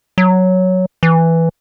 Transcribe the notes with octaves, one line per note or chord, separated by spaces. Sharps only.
F#3
E3